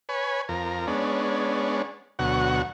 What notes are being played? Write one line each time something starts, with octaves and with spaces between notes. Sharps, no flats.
B4 C#5 G#5
F2 A#4
G#3 B3 C#4 D4
D2 B2 F#3 F#5 C#6